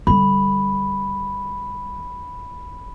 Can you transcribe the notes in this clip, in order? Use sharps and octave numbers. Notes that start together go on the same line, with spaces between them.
D3 G3 B5